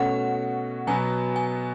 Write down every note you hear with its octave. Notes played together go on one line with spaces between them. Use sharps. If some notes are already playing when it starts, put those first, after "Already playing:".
Already playing: B2 A3 C#4 F#4 F#5
B2 F#3 B3 G#5
G#5